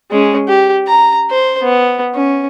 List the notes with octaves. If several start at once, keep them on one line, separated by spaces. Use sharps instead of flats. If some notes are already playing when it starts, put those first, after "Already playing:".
G#3 C#4
G4
A#5
C5
B3
C#4